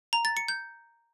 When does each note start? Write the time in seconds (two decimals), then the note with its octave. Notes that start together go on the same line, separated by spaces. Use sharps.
0.13 A#5
0.25 A6
0.37 C#7
0.48 G6